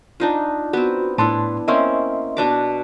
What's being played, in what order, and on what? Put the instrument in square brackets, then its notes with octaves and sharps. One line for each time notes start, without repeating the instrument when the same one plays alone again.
[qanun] D4 D#4 F4
[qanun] B3 C4 [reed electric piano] F#4
[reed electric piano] A2 A5 C6 [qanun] B3 D4 E4
[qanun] A#3 C4 C#4 [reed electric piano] D#5 E5 C6
[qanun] B2 D4 D6